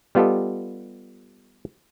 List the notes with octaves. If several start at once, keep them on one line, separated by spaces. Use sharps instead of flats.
G3 B3 F4 G4 A4 D#5